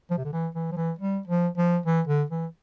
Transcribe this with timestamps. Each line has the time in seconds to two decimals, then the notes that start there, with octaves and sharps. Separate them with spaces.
0.10 F3
0.18 C3
0.24 D3
0.32 E3
0.55 E3
0.72 F3
0.76 E3
0.99 G3
1.27 F3
1.57 F3
1.86 E3
2.08 D3
2.30 E3